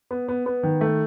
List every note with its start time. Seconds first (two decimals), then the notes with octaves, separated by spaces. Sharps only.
0.11 B3
0.28 B3
0.46 B3
0.63 D#3
0.81 A3